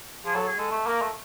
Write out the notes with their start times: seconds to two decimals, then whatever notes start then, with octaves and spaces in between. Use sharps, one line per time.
0.24 F3 G#4
0.35 F#3 A4
0.47 G#4
0.58 G#3 A4
0.71 A3
0.86 A#3 A#4
1.01 A3